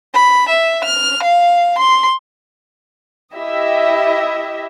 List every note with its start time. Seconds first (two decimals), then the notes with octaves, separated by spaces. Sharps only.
0.14 B5
0.49 E5
0.85 F6
1.23 F5
1.79 C6
3.35 E4 G4 D#5 E5